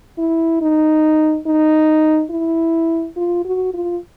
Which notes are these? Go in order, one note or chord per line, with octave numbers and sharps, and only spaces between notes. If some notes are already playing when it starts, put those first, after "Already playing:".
E4
D#4
D#4
E4
F4
F#4
F4